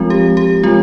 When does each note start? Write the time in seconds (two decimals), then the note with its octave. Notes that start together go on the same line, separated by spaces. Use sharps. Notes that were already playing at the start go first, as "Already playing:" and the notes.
Already playing: F3 G#3 C4 F4
0.10 G4
0.37 G4
0.63 F3 G#3 C4 F4